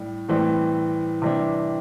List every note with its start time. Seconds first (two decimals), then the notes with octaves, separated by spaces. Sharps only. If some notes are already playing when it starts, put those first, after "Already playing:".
Already playing: A2 G3
0.28 A2 E3 G3 C4
1.22 C3 E3 G3 D4